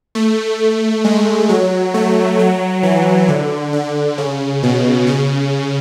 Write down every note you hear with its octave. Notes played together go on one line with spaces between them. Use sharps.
A3
G#3
F#3
A3
F#3
E3
D3
D3
C#3
B2
C#3